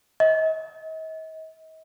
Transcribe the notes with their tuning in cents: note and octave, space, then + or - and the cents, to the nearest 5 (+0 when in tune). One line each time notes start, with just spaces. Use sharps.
D#5 +45